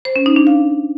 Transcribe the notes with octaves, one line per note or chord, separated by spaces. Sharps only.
C5
C#4
D#4
D4
F5